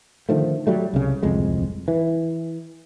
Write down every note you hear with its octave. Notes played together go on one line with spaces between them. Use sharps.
D3 D#3 F3 A3
F#3 G3 A3
C2 C#3
D1 C2 F2 G#3
E3